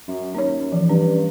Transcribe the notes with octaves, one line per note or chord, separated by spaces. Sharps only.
F#2
D#2 C#4 C#5
E3 F3
G2 C#4